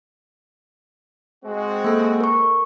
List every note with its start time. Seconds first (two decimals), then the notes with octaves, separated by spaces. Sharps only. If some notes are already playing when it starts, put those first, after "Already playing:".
1.44 G#3 C4 F#4
1.84 A#3 A4
2.20 A#4 C#6